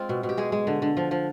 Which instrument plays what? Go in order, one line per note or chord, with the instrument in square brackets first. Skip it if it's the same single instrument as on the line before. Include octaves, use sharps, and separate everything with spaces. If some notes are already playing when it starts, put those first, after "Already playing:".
Already playing: [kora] G#3 C4 F4
B2
B2
G4
G#3 G#4
G#3
D3
D3
F3
F3